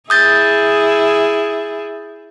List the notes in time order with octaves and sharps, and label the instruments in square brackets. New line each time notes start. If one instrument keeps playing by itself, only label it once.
[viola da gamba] E4 G#4 [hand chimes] D#6 G6 A6